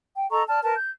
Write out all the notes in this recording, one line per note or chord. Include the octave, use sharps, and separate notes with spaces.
G5
A4 D#5 A#5 C#6
D5 A5 F6
A#4 B4 A5
G6